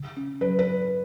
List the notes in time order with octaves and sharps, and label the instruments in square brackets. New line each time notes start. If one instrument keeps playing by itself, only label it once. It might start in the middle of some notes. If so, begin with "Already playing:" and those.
Already playing: [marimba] C#3
C#4
[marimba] F#3 [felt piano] B4
[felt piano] B4